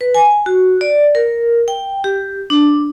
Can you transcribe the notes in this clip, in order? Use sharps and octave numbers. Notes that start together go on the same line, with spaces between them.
B4
G#5
F#4
D5
A#4
G5
G4
D4